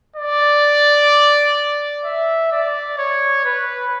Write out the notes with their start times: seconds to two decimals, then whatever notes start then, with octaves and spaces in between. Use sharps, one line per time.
0.16 D5
2.04 E5
2.52 D5
2.98 C#5
3.45 B4